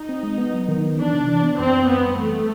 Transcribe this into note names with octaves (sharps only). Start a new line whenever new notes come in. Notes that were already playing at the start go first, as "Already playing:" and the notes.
Already playing: D#4
C4
G#3
B3
F#3
D#3
B3
E3 D4
C3
E3
B3
F#2 C4
F#2
F#2 B3
G3
E3 A3